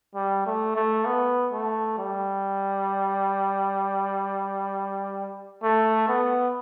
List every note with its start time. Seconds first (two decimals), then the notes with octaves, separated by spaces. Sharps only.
0.15 G3
0.46 A3
0.76 A3
1.07 B3
1.53 A3
1.98 G3
5.63 A3
6.09 B3